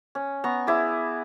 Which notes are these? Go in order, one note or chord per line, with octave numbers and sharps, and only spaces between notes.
C#4
B3 A#5 C#6
E4 G#4 D5